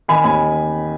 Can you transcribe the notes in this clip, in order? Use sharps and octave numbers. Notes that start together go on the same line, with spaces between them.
D#3 G#5 B5
D#2 G#5 B5